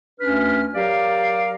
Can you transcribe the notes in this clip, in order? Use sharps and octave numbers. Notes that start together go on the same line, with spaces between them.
D2 C#4 D4 B4 F6
F#3 G4 A#4 D5 F5